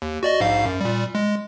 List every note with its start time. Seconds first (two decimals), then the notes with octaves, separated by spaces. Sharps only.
0.02 D#2
0.23 F#4 D5 D#5
0.40 A#1 G#2 F5
0.66 F#2
0.81 A#2 G3
1.15 G#3